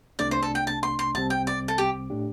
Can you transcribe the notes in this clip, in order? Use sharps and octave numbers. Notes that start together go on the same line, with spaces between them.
C2 C3 A3 D4 D5
C5
A4
G5
A5
C6
C6
C2 C3 G3 C4 A5
G5
D5
A4
G4
A2 A3 D4 G4